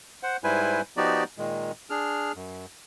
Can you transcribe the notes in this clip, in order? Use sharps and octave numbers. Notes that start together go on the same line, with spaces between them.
C5 F#5
G#2 G3 E4 B4 C5 G#5
F3 B3 D#4 F#4 G4 D5
A#2 D#3 G#3
D4 G#4 F6
F#2